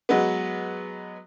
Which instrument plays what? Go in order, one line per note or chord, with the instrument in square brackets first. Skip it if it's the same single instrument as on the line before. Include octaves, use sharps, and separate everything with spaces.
[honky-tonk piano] F#3 G#3 B3